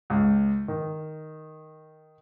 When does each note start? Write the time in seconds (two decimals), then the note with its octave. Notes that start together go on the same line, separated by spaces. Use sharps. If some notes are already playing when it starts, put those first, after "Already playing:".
0.10 C#2
0.68 D#3